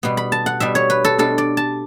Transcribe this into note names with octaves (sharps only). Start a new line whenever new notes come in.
B2 G3 B3
B5
A5
F#5
B2 G3 B3 E5
C#5
B4
A4
B2 G3 D4 A4
D5
A5